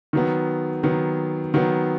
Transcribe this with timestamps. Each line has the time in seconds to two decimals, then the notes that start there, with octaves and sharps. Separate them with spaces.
0.13 D#3 F#3 B3
0.83 D#3 F#3 B3
1.54 D#3 F#3 B3